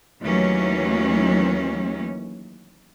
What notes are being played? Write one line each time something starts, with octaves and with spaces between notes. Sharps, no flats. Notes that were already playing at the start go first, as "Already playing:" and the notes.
D#2 E3 F#3 A3 C#4